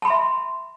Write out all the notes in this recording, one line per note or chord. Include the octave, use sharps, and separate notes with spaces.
E5 A5 B5 C6